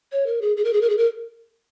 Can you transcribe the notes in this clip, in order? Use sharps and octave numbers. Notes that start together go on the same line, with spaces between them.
C#5
A#4
G#4
G#4
A#4
G#4
A#4
G#4
A#4